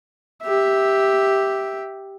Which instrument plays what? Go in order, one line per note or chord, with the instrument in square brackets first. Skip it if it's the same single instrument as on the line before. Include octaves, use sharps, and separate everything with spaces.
[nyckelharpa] G4 E5